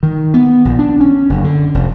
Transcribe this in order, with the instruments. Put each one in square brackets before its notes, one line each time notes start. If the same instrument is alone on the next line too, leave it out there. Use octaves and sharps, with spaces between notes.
[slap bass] D#3
B3
A#1
D4
C#4
F#1
D3
F1